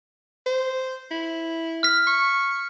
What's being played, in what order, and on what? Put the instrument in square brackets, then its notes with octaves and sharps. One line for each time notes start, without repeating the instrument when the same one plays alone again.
[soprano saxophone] C5
E4
[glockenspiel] F6 B6
[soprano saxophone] C#6